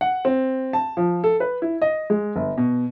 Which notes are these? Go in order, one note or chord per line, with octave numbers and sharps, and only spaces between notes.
F#5
C4
A5
F3
A4
B4
E4
D#5
G#3
G1
B2